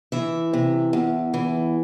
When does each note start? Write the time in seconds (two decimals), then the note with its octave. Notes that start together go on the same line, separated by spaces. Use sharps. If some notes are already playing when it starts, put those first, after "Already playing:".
0.12 E3 E5
0.53 C3
0.93 E2
1.34 E3